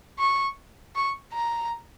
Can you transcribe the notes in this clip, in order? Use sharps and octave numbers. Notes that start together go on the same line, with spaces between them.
C#6
C#6
A#5